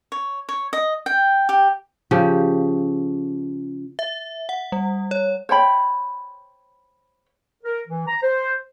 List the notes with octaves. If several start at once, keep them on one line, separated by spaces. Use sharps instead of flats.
C#5
C#5
D#5
G5
G4
C#3 F3 G4
E5
F#5
G3
C#5
C5 C#5 G5 B5
A#4
E3
A#5
C5